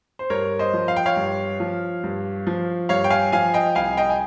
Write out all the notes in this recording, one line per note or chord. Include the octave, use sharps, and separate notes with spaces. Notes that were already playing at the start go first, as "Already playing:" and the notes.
C5
G2 A#4 C#5
C5 D#5
F3
F5
G5
C#5 F5
G2
F3
G2
F3
G2 C#5 F5
G5
F5 G#5
F3 F5 G#5
D#5 G5
C2 F5 G#5
D#5 G5
G#5